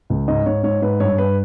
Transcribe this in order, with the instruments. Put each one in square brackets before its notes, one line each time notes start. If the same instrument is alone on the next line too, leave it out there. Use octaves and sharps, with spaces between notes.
[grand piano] C#2
G#2 D#5
G#2 C#5
G#2 C#5
G#2 B4
G2 C#5
G2 B4